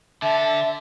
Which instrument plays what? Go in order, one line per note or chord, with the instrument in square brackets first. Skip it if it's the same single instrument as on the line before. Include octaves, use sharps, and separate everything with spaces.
[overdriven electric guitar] D3 [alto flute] E5 [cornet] A5